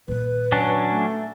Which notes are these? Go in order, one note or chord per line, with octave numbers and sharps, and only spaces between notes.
A#2 D#3 B4
F#3 C#4 D4
A3